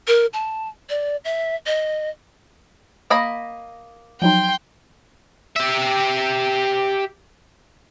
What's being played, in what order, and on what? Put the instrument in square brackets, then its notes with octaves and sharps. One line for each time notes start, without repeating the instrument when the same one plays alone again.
[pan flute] A#4
A5
D5
E5
D#5
[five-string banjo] A#3 D#5 B5
[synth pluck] F3 F#3 D#4 [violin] G5 C6
[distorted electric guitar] G4 E5